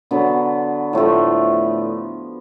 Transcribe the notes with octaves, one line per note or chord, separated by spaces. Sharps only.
D3 F#3 B3
A2 F3 A3